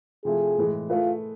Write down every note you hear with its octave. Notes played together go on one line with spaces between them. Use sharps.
C3 F3 A3 E4 G#4
A2 E3 G#3
A3 E4 F4 G#4 B4